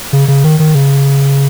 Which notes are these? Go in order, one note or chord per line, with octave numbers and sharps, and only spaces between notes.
C#3
C#3
D#3
D#3
C#3